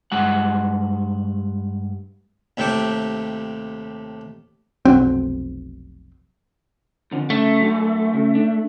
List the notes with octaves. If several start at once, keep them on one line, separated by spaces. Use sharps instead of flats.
G2 G#3 F#5
D#2 C3 A3 G5 A5 D6
F1 B1 F#3 C4
F2 D3 F3
C#3 A3 E5
F#3 D4 E5
C#3
D4